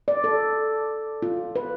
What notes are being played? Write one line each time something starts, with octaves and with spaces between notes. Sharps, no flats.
D5
A4
F4
B4